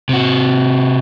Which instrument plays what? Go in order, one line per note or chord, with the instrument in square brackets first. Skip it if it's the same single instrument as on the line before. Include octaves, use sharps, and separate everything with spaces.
[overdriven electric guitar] C3 F#4